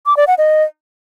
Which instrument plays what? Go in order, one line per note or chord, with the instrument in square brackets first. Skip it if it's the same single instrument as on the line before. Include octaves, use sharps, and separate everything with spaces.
[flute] D6
D5
F#5
D#5